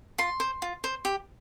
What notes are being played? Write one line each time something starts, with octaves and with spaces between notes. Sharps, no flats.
F4 C6
C5
F4
C5
G4